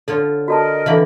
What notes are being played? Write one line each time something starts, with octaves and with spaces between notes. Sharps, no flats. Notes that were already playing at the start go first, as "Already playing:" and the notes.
D3 F4 A4 C#5
F#4 A4 A#4 D5 D#5 A5
D3 E3 E5 F5 B5 D6